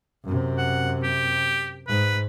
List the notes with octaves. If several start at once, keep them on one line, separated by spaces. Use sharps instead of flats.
F#2 C3
F#5
G4
G#2 B4